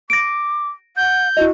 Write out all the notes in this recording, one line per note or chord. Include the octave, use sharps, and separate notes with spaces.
D6 A#6 D7
F#5 G6
E4 F#4 D#5